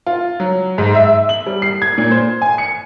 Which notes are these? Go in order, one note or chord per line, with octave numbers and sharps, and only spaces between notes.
F4
F#3
G#2
E5
F#7
G3
C7
G#6
A#2
C5
G#5
C#7